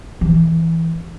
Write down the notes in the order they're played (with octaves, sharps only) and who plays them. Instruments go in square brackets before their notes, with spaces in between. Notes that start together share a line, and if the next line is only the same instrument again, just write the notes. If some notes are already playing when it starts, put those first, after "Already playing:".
[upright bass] E3